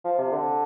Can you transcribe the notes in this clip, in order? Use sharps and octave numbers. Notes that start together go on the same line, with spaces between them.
F3
C3
D3